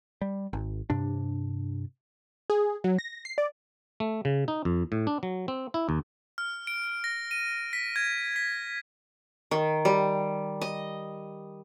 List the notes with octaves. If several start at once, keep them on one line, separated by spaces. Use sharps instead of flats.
G3
G#1
G2 C3 D4
G#4
F#3
A#6
C7
D5
A3
C#3
D#4
F2
A2
D4
F#3
C4
E4
D#2
F6
D7
A#6
D#7
B6
G#6
B6
D#3
G3
D#5